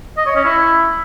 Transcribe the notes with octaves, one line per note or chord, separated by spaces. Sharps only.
D#5
C#5
C#4
E4